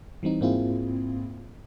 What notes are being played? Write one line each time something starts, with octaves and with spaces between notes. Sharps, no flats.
E3 G3 C4 D#4
G#2 A#3 C4 E4 F4 G#4